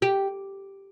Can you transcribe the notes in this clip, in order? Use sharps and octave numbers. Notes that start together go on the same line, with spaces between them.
G4